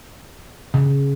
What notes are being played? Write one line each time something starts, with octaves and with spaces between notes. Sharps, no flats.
C#3